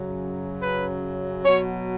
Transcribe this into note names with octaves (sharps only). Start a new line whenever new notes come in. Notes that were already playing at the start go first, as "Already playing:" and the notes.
Already playing: F#2 C#3 F#3
B4
B2 F#3 C#5